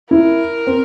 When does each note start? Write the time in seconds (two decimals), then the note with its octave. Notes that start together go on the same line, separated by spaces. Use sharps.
0.11 E4 A#4
0.67 C4